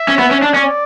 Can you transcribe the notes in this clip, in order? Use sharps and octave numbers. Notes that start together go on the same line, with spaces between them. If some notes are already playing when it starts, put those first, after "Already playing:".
Already playing: E5
C#4
B3
C#4
D4
C#4 D5